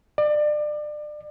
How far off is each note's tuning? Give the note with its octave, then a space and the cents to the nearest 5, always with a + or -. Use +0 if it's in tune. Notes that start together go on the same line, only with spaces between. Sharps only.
D5 +30